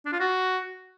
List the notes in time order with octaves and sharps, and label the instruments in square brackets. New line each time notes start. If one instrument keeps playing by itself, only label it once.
[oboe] D4
F4
F#4